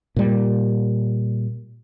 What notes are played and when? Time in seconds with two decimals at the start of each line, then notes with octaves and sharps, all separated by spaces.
0.16 A#2 G3